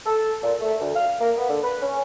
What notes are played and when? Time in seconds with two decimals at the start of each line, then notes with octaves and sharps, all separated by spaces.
0.06 A4
0.43 A#2
0.61 A3
0.80 D2
0.96 F5
1.20 A#3
1.37 B3
1.49 D3
1.63 B4
1.82 C#4